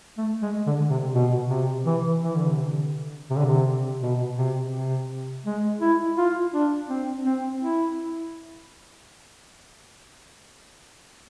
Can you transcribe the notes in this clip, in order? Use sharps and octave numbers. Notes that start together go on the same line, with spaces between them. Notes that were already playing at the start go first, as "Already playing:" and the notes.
A3
G#3
D3
C3
B2
C3
E3
E3
D3
C3
D3
C3
D3
C3
B2
C3
C3
G#3
E4
F4
D4
C4
C4
E4